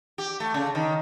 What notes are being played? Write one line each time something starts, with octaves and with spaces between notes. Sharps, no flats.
G4
A3
C#3
D#3